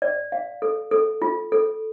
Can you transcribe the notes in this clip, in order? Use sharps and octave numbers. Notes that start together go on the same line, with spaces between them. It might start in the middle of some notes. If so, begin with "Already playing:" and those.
D5
F5
A4
A4
F4
A4